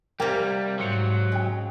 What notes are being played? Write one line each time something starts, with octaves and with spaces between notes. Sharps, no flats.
C3 G3 A#3 G5 G#6
G#2 F#3 C6 C#7 F7
C#3 D#5 G5